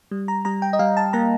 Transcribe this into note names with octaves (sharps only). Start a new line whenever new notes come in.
G3
A#5
G3 A#5
G5
D#5
G3 F5
A5
A#3 A#5